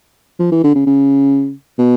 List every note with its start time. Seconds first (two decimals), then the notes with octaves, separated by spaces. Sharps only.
0.39 F3
0.52 E3
0.64 D3
0.75 C#3
0.86 C#3
1.78 B2